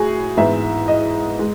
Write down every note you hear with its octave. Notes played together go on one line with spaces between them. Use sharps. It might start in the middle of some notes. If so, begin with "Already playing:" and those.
Already playing: A2 F#4 G#4
G#2 E3 B3 E5
D#5
G#3